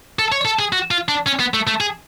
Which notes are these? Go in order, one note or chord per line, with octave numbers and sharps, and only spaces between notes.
A4
C#5
A4
G#4
F#4
F4
D4
C#4
B3
A3
A3
G#4